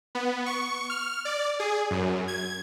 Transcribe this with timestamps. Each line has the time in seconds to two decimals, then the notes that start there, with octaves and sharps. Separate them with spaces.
0.15 B3
0.46 C#6
0.90 F6
1.25 D5
1.60 G#4
1.91 F#2
2.28 G#6